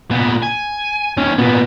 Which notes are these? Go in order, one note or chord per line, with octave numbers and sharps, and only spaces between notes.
A#2 B3
G#5
D#2 C#4
A#2 B3